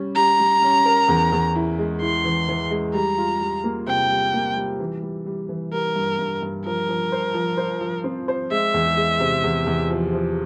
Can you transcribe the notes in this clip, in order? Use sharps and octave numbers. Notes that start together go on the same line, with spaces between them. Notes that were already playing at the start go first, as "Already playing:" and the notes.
Already playing: G3 C#4
G4 A#5
G3
C#4
A#4
E2
E2
E4
G#3
E4 C6
E3
E3
G#3
G3 A#5
F4
G3
A#3
C3 G5
G3
A#3
G3
E3
G3
G3
E3
G3 A#4
G2
G2
G2
F3 A#4
F3
C5
F3
C5
F3
C4
C5
G#3 E5
E2
G#3
C3
E2
E2
F3
F3